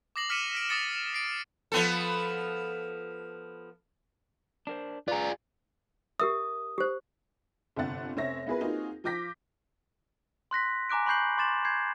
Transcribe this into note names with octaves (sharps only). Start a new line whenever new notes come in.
D6 D#6 A#6 C7 F#7
D6 F6 B6 C#7 D#7 E7
B6 D7
D6 D#6 A6 A#6 C#7 D7
A#6 C7 D7
F3 B3 A4
D4 A#4 C5
F4 G#4 B4 D5 A#5
G4 A#4 E5 D#6
G4 C5
G1 C3 D4 F#5 A6
F1 C4 C#4 C#5 E5 A#6
B3 E4 F4 G#4 A#4 B4
A#3 C4 D#4 F4 F#4 G#4
F3 F4 D6 G6 A#6 B6
C6 F#6 A#6 B6
G#5 A#5 D6 F#6 D7
B5 C#6 F#6 G6 C7 F#7
C6 D6 A6 E7 F#7
G6 G#6 C7